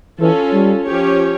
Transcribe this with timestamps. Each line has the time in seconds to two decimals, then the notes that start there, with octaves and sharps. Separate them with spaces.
0.20 E3 C#4 F4 A4
0.53 G3
0.85 F3 C#4 G4 C#5